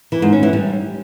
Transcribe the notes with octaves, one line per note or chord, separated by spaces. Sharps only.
E3
G#2
C#4
E3
G3